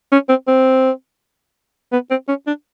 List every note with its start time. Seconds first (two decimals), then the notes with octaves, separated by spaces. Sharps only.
0.12 C#4
0.29 C4
0.47 C4
1.92 B3
2.10 C4
2.28 C#4
2.47 D4